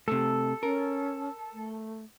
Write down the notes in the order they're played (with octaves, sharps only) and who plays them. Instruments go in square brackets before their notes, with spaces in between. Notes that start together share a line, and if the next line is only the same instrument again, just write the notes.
[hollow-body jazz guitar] C3 A3 [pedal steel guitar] A4
[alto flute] C#4 [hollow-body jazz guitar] A#4
[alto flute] A3